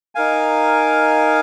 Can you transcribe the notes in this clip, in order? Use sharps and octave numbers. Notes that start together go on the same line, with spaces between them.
D#4 A#4 F5 G#5